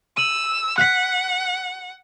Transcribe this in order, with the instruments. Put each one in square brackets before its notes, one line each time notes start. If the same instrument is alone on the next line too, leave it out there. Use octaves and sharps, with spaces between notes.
[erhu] E6 [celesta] D#7 F#7
[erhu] F#5 [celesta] F#6 B6